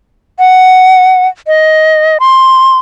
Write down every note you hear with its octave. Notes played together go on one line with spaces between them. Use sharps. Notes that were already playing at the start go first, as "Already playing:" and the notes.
F#5
D#5
C6